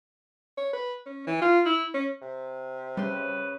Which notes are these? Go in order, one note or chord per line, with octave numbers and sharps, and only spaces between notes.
C#5
B4
C#4
E3
F4
E4
C#4
C3
C#3 G3 B4 C6